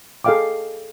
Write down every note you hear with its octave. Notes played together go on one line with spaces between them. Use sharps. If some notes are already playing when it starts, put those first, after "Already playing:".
G#4 A4 D#5 F5 G5 D6